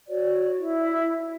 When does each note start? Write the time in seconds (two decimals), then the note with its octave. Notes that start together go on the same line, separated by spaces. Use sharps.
0.08 F#4 C#5 D5
0.57 E4